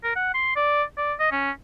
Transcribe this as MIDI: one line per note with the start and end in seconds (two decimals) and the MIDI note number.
0.04 0.13 70
0.16 0.32 78
0.34 0.54 84
0.56 0.83 74
0.98 1.14 74
1.20 1.31 75
1.32 1.51 61